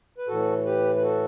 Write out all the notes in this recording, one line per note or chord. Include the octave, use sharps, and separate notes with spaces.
B4
A2 E3 F#4 A4
G4 B4
B4
F#4 A4